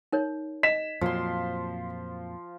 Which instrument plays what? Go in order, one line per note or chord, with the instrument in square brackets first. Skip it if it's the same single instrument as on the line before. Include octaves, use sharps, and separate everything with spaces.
[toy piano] D#4 A#4 C#5
[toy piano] D#5 [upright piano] B6 E7
[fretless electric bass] F2 A#2 F#3 [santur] F3 C6